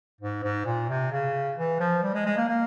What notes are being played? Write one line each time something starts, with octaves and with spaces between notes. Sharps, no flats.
G#2
G#2
A#2
C3
C#3
E3
F3
G3
G#3
G#3
A#3
A#3